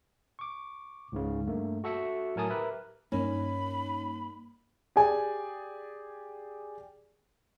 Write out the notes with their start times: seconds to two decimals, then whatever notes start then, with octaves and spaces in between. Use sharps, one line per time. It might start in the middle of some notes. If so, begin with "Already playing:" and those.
0.39 C#6 D6
1.12 C#2 G#2 C#3
1.47 G2 A3 A#3
1.84 F#4 A4 E5 C#7
2.36 A2 F#3 A#4 G#5 A5 D#6
2.50 G4 A#4 B4 E5
3.12 G2 A#3 C#4 D#4 B5
4.96 G4 G#4 D5 G#5